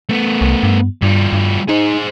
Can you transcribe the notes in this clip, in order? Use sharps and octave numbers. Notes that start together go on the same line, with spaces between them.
A3 B3
C2
G2
G2 F3 G3
G2
D#4 G#4 C5